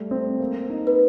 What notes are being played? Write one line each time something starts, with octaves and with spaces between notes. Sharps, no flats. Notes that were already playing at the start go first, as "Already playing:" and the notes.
Already playing: G3 A3
C4
A#3
D#4
B4